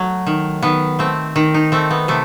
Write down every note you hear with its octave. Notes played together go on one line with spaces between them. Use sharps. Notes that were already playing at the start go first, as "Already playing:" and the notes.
Already playing: F#3 A3
D#3
D#3 B3
A3 C4
D#3
D#4
A3 C4
B3
C3 A3